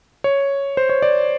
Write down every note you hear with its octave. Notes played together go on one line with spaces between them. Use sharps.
C#5
C5
C#5
D5